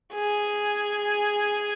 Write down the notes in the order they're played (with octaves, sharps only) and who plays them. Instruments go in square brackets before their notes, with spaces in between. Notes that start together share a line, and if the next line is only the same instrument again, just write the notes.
[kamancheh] G#4